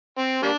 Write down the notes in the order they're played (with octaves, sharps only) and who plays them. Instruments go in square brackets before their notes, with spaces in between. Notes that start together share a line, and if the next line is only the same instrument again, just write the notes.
[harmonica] C4
G3 A#3 D4